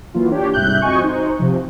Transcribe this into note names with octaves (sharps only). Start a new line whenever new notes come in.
E3 F#3 A#3 F4
D4 G4 C#5
C2 G#2 E5 F#6 G6
F2 F#4 D#5 G#5 C#6
D#4 C5
C3 F3